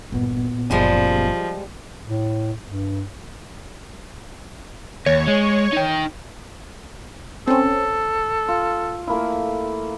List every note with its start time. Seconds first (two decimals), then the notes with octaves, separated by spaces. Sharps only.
0.12 G1 D#2 A#2 B3
0.71 F#1 F#2 F3 G3 G#3
2.06 A2
2.66 G2
5.06 D#2 C#5
5.27 G#3
5.73 D#4 G5
7.47 C4 C#4 A4
8.48 F4
9.08 A3 A#3 E4